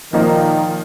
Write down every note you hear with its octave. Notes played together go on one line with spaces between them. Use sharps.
A#2 D#3 F3 A#3 D#4